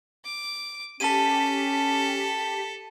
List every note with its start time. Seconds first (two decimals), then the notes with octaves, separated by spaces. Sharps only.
0.24 D6
1.00 C#4 G4 A4 A5 B6 D#7